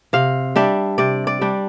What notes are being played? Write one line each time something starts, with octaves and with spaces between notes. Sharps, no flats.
C3 F5
G3 D4 E5
C3 D5
D5
G3 D4